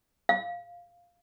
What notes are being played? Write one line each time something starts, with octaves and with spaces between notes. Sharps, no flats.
F5